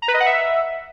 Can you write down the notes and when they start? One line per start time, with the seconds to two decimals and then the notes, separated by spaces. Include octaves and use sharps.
0.02 A#5
0.08 B4
0.14 D#5
0.20 F#5
0.26 E5